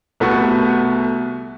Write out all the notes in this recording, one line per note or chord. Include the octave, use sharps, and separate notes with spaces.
C2 A3 B3 F#4 C#6